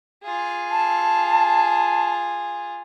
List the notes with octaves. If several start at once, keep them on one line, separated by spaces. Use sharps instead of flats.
F4 G#4
A5